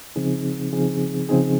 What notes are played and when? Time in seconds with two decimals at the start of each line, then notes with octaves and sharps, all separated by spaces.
0.16 C#3 F3 C4 D#4 G#4
0.73 C#3 F3 C4 D#4 G#4
1.29 C#3 F3 C4 D#4 G#4